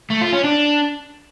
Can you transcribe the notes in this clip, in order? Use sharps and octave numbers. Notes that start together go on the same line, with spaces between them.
A3
F4
C#4
D4